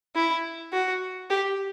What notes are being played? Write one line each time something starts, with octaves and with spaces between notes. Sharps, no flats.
E4
F#4
G4